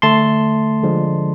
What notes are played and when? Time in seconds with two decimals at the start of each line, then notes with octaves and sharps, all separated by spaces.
0.02 D3 A3 A5 C6
0.83 D3 F3 G#3